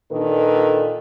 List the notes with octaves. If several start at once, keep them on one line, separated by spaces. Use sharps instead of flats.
A#2 D#3 D4 A4 B4